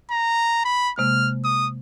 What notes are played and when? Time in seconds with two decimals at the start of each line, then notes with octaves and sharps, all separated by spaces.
0.11 A#5
0.65 B5
0.98 C3 G#3 A#3 F6
1.44 D#6